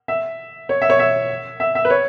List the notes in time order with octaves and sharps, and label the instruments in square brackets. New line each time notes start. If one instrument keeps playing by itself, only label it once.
[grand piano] E5
C#5
E5
C#5
E5
E5
E5
B4
C#5